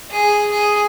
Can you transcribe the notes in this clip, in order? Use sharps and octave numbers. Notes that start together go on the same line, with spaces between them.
G#4
G#4